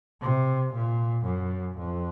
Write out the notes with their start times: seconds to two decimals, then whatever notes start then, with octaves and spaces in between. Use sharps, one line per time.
0.22 C3
0.73 A#2
1.25 F#2
1.78 F2